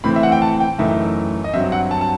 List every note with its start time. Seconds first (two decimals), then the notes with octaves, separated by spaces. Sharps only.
0.04 A2 E3 A3 C4 B5
0.16 E5
0.23 F#5
0.32 G5
0.42 A5
0.60 G5
0.79 F#2 E3 A3 D#4 E5
1.44 D#5
1.53 G2 F#3 C4 E5
1.72 F#5
1.91 A5
2.01 A5